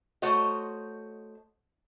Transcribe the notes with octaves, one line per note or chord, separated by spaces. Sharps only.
A3 F#4 C5 C#5 D#5